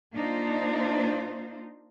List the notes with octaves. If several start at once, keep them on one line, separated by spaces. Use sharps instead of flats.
A#3 D4 D#4 F4 C5